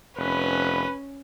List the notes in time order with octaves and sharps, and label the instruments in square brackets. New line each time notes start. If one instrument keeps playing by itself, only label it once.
[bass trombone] F1 [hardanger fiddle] C#4 [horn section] B4